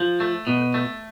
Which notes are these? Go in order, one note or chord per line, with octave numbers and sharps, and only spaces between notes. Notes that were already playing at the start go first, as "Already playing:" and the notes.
Already playing: F3
A3
B2
A3